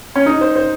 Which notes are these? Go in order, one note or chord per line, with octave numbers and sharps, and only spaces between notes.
C#4
D#4
C5
C5